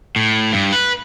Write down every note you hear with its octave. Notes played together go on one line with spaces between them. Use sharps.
A2
G2
B4